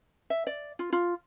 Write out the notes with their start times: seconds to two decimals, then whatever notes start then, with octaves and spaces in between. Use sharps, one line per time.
0.30 E5
0.47 D5
0.79 F4
0.93 F4